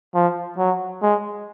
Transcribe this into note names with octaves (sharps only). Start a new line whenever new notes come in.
F3
F#3
G#3